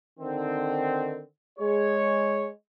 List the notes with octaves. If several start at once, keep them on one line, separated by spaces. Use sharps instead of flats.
D3 D#3 C4
G#3 G#4 C#5